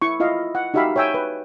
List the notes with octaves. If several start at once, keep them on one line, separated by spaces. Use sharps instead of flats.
E4 C#6
E4 F4 D#5 F5
F#5
D#4 F#4 G4 E5 F5 B5
C#5 E5 G5 G#5 E6
B4